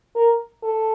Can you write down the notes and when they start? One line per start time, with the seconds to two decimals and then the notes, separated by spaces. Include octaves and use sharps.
0.15 A#4
0.63 A4